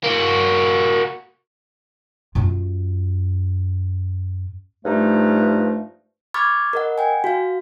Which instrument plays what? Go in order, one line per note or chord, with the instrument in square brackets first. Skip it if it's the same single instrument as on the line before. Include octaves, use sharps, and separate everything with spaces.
[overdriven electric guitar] A#3 F#4
[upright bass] F#2 F4
[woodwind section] G2 F3 A3 D#4
[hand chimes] B5 C#6 D6 F6 G#6 A6
A#4 D#5 F#5
G5 G#5
F#4 F5